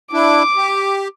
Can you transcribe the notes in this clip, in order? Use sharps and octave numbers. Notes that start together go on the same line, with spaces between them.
D4 E4 D6
G4